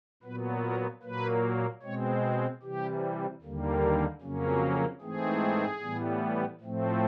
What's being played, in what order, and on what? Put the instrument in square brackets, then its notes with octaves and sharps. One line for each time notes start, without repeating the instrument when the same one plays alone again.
[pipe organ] A#2 F#3 B3 B4
A#4
A#2 F#3 A#3 B4
B2 G#3 C4 C#5
G#4
C3 E3 G3 G4
D#2 D3 G3 A#3
F2 C#3 F#3 A#3 C#4
G#2 E3 A3 C4 G#4
A2 E3 G3 B3
A2 F3 A3 C4